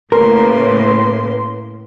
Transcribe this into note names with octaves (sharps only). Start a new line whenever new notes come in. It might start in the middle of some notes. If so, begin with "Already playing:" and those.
A2 C#3 A#3 A#4 B4 C6